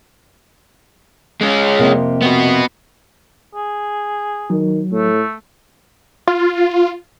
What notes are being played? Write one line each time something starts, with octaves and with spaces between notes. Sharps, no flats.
G#3 C#4
F2 C3 A#3
B3 F#4
G#4
D#3 F#3
A2 A3
F4